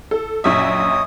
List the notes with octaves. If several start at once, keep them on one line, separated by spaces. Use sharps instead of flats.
A4
A#1 F#2 C#5 D#5 E5 D#6